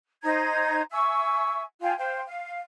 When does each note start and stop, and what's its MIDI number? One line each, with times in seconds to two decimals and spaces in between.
0.23 0.81 63
0.23 0.81 72
0.23 0.81 82
0.23 0.81 92
0.91 1.61 76
0.91 1.61 80
0.91 1.61 85
0.91 1.61 88
1.81 1.94 65
1.81 1.94 77
1.81 1.94 79
1.81 1.94 80
1.97 2.20 72
1.97 2.20 77
1.97 2.20 79
2.26 2.59 77